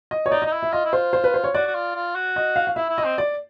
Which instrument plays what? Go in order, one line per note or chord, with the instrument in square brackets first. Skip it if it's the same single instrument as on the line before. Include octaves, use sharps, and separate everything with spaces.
[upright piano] D#5
C#5
[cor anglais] D#4 [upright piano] D5
[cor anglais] D#4 [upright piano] D#5
[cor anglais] E4
[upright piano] E5
[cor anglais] F4 [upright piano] D#5
[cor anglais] E4
[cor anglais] F4 [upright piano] C5
[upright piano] C5
B4
C5
C#5
[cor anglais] F#4 [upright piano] D5
[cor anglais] F#4
F4
F4
F#4
[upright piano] D#5
F5
F5
[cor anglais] E4 [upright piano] E5
[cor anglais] E4
[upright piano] D#5
[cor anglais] C4
[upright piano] D5